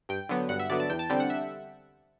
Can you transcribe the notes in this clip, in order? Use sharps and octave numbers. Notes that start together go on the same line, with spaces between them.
G2 G5
D3 F#3 B3
G2 F#5
E5
D3 F#3 B3 D5
A5
E2 G5
A5
D3 G3 C4 G5
F#5
E5